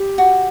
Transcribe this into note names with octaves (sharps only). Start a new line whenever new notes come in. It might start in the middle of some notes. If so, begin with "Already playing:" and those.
Already playing: G4
F#4